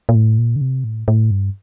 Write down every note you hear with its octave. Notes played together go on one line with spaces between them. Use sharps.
A#2
A2
A#2
D3
C3
A2
A2
G2